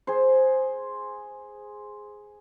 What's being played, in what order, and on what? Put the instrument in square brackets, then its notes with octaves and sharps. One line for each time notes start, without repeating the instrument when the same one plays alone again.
[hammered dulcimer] G#4 C5